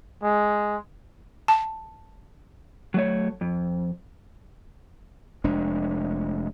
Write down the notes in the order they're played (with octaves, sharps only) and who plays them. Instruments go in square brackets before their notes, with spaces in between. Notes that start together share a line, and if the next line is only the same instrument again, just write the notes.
[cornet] G#3
[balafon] A5
[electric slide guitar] F#3 A3 C#5
F2
[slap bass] F1 G#3 D4